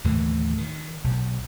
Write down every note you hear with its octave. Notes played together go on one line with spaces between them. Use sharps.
D#2 A2 D3 E3
D#3
B1